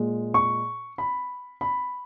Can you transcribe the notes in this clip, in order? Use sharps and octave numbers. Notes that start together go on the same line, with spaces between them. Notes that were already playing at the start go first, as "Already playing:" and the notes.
Already playing: A#2 G#3
C#6
B5
B5